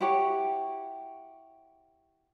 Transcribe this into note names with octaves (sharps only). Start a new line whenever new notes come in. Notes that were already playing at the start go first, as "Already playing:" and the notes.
E4 F#4 G4 C#5